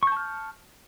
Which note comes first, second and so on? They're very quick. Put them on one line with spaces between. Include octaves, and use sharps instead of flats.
C#6 G6 A5 F6